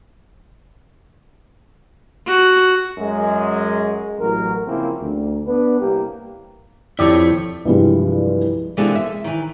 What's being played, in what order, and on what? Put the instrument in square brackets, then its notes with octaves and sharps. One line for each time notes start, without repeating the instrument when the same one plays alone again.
[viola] F#4
[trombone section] F#2 G#3
A1 F#3 A#4
C#3 F3 A#3 C4 C#4 E4
D2
B3 D4 B4
C2 A#3 G4
[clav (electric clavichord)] F2 G4 D5 [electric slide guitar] E4 C#5
[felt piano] C2 G2 E3 F3 G3 G#3
[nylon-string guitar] C3 E3 G#3 A#3 D4 A4
E5
D#3 E3